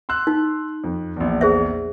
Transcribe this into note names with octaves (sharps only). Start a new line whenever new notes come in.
C6 E6 F#6
D#4
F2
A#1 E2
G#4 C5 E5